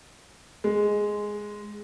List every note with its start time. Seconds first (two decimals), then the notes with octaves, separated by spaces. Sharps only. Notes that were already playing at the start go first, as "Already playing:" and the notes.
0.64 G#3